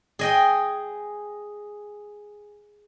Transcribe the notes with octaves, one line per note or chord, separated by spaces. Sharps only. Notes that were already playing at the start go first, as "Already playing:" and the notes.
G#4 D#5 G5